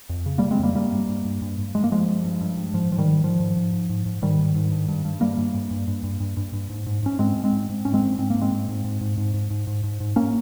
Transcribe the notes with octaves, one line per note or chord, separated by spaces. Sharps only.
F2
C#3
C#3 G3 A#3
G#3 C4
F2 G3 A#3
G2 G3 A#3
G2
G2
G2
G2
G2
G2 G#3
A#3
G2 F3 G#3
G2
G2
G2
G2
G#2 F3
G#2 F3
D#3 G3
G#2
G#2 F3
G#2
G#2
G#2
G#2
G#2
G#2 D#3 G3
G#2
G#2
G2
G2
G2
G2 G3 A#3
G2
G2
G2
G2
G2
G2
G2
G2
G#2
G#2
G#2 C#4
G#2 G#3 C4
G#2
G#3 C4
G#2
G#2
G#2 C#4
G#3 C4
G#2
G#2 C4
G#2 A#3
G#3 C4
G#2
G#2
G#2
G#2
G#2
G#2
G#2
G#2
G#2
G#2
A#3 C#4